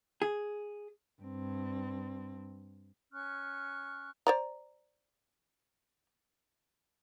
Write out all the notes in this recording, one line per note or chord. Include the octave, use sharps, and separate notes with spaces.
G#4
G2 C4
C#4 C#6 F6 F#6
C5 D5 A#5